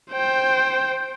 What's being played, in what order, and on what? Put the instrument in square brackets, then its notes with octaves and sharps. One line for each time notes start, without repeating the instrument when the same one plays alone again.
[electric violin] C5 G5